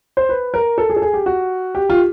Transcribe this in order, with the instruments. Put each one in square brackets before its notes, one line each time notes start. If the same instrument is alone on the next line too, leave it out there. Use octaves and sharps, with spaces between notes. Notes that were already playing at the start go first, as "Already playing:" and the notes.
[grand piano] C5
B4
A#4
A4
G#4
A4
G#4
G4
F#4
G4
F4